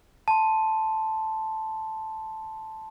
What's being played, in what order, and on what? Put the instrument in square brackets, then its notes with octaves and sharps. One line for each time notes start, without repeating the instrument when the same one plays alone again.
[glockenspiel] A5 C6